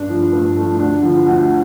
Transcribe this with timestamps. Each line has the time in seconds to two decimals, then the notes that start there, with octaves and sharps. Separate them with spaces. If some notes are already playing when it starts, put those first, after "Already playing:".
Already playing: G2 D4
0.09 F3 A3
0.32 G2
0.56 F3 A3
0.79 D2 D4
1.03 D3 F3
1.26 D2